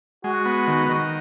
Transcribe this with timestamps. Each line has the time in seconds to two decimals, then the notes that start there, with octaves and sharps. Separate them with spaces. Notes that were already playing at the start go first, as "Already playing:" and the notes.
0.24 G#3 F#4
0.46 B3
0.67 D#3
0.89 D#3